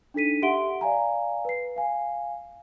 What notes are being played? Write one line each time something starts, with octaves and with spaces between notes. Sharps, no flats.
D4 D#4 A4 B6 D#7
G4 E5 F#5 C6 D7 G7
D5 F5 G#5 A#5
B4 C7
F5 G#5